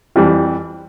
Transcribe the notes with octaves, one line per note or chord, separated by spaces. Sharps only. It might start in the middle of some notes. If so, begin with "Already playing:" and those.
F2 E3 G3